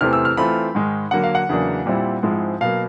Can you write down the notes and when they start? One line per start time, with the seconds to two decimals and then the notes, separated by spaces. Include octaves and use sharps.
0.01 E2 C3 E3 A3 C4 F6
0.13 E6
0.25 F6
0.37 E3 A3 C4 F4 B5
0.75 G#2 D#3 G#3
1.11 D3 F#3 A#3 F#5
1.24 F5
1.35 F#5
1.49 E2 C#3 F#3 A#3 D4
1.86 A#2 G3 C4 E4
2.23 G#2 F3 G#3 C4 E4
2.61 B2 F#3 A#3 F5